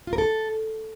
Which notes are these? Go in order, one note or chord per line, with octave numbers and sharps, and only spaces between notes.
F4
A#4
A4